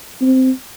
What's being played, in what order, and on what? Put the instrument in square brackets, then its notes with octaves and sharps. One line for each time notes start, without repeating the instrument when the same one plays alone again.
[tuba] C4